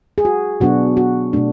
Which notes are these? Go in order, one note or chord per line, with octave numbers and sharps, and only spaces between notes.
G#4
F#4
B2 F#3 B3 D4 F#4
F#4
B2 A3 D4